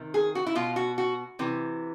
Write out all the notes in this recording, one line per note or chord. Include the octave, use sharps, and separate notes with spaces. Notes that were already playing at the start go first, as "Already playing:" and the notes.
Already playing: C3 D#3
G#4
F#4
E4
B2 F4
F#4
F#4
C3 E3